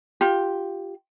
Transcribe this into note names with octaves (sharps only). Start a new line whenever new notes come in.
F4 G4